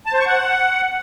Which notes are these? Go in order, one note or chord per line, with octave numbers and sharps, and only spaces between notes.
A5
C5
C#6
F#5